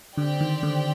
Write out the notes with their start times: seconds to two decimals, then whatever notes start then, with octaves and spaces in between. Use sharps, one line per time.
0.17 D3 C4 G4 D5 G5
0.41 D#3
0.63 D3